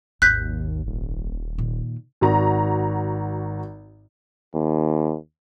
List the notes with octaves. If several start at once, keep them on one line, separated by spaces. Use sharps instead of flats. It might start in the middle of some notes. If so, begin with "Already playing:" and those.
G#1 D#2 F#6 G6 B6
D#1
A#2 D#3
G#1 F#4 A#5
D#2